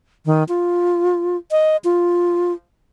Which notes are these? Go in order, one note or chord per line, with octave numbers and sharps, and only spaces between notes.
D#3
F4
D#5
F4